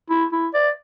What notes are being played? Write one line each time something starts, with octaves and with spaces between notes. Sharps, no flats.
E4
E4
D5